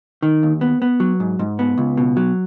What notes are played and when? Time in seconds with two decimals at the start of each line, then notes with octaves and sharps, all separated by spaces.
0.22 D#3
0.43 D#2
0.61 B3
0.82 B3
1.00 F#3
1.20 G#2
1.39 G#2
1.59 B3
1.78 C#2
1.97 B2
2.17 F#3